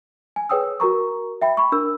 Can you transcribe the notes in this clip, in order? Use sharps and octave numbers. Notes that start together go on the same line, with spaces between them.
G#5
G#4 B4 C#5 G5 D#6 E6
F#4 A#4 A#5 C#6
E5 G5 B5
B5 C#6
D4 A#4 E6